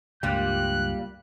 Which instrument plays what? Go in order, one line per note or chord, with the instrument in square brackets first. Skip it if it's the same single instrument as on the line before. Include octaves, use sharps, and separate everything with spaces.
[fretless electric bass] C#2 G2 [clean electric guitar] G3 [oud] A#3 F4 G4 [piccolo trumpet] F#6